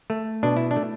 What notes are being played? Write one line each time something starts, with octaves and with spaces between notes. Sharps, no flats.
A3
B2 D4
E4
D4
A3